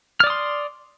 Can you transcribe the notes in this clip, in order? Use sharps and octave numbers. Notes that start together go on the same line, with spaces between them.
D5 C6 D#6 F6